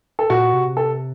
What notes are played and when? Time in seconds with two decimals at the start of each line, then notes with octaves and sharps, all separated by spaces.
0.19 A4
0.30 A#2 F#4
0.53 C3
0.77 A4